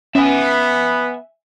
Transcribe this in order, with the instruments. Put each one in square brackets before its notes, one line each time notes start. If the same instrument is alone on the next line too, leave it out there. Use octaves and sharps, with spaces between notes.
[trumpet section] B3 [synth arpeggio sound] C#4 [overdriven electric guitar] E5 G#5